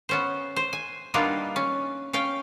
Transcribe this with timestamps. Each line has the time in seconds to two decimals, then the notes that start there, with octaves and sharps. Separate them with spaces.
0.09 B3 C#4 C5
0.56 C5
0.73 G#5
1.14 G3 A#3 B3 D4 D#4 F4
1.56 C#4
2.13 C#4 F5 G5